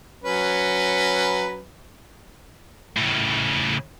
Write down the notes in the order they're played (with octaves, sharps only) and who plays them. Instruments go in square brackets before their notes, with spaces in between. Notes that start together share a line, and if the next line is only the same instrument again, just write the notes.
[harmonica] F#3 C#4 B4
[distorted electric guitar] A2 C#3